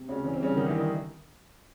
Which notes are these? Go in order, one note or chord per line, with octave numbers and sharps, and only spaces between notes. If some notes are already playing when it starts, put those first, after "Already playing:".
Already playing: C3
D2 C#3 C#4
E3 C#4
C4
G2 C#3 C#4
D3 D#3 D#4
E3 E4
D#3 D#4